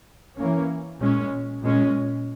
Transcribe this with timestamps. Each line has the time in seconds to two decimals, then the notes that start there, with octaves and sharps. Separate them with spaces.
0.37 E3 A#3 C#4
0.99 A#2 G#3 C#4
1.61 A#2 G#3 C#4